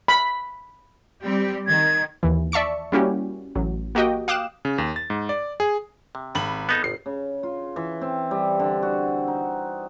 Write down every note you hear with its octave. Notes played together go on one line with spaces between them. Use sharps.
B5
G3 C4 G4
D#3 G#6
D#2 E3
D5 E5 A5 C#6 C#7
G3 A#3 C#4 E4 F#4 G4
A1 F#3
A#3 F#4 G4 D#5 G5
F5 G5 D6 D#6 F#6 E7
C#3
D#2
A6
G#2
D5
G#4
C3
G#1 B5 F#7
B3 D#4 A4
G1 C7
C#3
F4
E3
C4
G3
D3
F#4
D#4